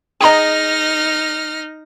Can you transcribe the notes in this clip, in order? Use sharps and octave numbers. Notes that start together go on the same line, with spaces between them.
D#4 G#4 D#5 G5 A#5 F6 A#6